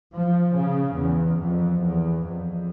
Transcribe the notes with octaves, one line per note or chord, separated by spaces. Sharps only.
F3
C#3
E2
F2
E2
F2